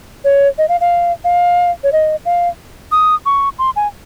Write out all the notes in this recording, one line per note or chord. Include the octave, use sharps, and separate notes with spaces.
C#5
D#5
F5
F5
F5
C#5
D#5
F5
D#6
C#6
C6
G#5